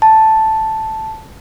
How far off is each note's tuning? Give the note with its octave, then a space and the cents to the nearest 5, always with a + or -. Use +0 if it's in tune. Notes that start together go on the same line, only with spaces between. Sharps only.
A5 +0